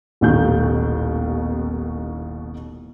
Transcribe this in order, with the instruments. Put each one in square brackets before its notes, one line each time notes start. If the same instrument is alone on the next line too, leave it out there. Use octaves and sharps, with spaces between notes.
[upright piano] D#1 A1 D#2 B2 D#3 G6